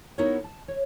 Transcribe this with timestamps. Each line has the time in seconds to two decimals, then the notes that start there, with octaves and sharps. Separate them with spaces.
0.18 B3 D#4 E4 F#4 A#4 C#5
0.44 A5
0.68 C#5